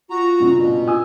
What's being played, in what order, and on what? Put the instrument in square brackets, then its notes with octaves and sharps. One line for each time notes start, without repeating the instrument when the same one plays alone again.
[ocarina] F4 [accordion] F#4 A#5
[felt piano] G2 A#2 C#3
[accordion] B2
[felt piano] G#5 D#6 E6